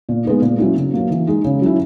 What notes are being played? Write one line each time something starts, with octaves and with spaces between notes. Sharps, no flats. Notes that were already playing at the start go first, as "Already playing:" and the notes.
A#2
G#3 B3 D#4
A#2
F#3 C#4 E4
C#3
F#3 A#3
E3
G#3 D#4
C#3
F#3 C#4 E4